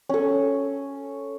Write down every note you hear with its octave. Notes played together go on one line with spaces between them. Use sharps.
C#4 A4